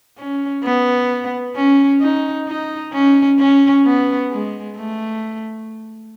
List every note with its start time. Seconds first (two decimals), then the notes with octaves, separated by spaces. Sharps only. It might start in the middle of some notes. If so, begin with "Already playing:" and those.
0.18 C#4
0.64 B3
1.56 C#4
2.01 D#4
2.48 D#4
2.93 C#4
3.39 C#4
3.85 B3
4.31 G#3
4.76 A3